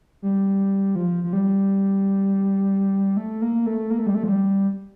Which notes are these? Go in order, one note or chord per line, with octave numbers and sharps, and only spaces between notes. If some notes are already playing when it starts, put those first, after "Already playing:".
G3
F3
F3
G3
A3
A#3
A3
A#3
A3
G3
A3
F3
G3